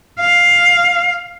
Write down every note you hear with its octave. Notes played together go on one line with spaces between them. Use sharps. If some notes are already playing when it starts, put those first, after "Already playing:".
F5